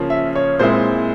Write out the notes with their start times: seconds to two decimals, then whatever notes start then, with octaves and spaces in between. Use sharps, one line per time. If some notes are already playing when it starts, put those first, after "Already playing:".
Already playing: C#3 F3 A#3 C#4
0.10 E5
0.35 C#5
0.59 A#2 G#3 C4 E4 C5